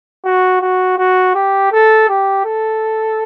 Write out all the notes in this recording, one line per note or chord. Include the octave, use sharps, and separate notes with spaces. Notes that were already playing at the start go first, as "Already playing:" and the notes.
F#4
F#4
F#4
G4
A4
G4
A4